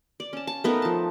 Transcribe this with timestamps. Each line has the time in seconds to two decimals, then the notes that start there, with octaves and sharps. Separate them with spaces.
0.20 D5
0.33 C#4 A5
0.47 A5
0.64 A3 B3 D#4 A#4
0.82 F3 A5